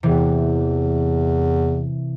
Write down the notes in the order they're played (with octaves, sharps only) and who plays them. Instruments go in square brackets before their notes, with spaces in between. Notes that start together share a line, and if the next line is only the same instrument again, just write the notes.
[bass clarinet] E2 [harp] C3 E3